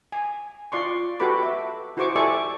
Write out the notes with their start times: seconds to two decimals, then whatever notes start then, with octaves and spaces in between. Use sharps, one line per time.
0.12 G#5
0.72 F4 D5 C6 C#6
1.20 F#4 G4 A4 B4 B5 D6
1.43 E5
1.97 E4 F#4 G#4 C5 C#6 D6
2.16 G4 A4 D5 E5 G#5 C#6